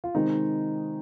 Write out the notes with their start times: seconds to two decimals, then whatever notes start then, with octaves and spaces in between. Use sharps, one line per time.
0.04 F4
0.15 C3 D#3 G#3 C4 D#4